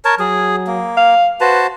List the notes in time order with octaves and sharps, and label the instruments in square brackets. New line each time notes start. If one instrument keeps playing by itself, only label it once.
[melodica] A#4 C#5 A5
[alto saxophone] F#3 [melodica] G#4
[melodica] A#3
[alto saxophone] F5
[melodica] F#4 C5 A5 [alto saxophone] B4